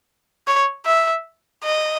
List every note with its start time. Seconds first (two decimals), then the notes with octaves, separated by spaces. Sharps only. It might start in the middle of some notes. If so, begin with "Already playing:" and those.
0.47 C#5
0.86 E5
1.64 D#5